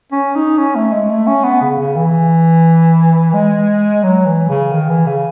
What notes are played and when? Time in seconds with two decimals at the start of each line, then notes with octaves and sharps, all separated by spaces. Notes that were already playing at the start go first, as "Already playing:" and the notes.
0.12 C#4
0.35 D#4
0.58 C#4
0.76 A3
0.93 G#3
1.10 A3
1.27 C#4
1.44 B3
1.62 C#3
1.79 C#3
1.96 E3
3.34 G#3
4.03 F#3
4.26 E3
4.49 C#3
4.72 D#3
4.89 E3
5.07 C#3